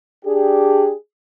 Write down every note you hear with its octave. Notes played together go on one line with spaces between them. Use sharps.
D4 G4 G#4